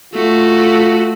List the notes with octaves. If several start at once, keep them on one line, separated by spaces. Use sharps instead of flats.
A3 F4 F#4